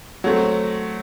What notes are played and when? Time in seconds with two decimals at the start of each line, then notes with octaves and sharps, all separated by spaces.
0.24 F#3 A3 C4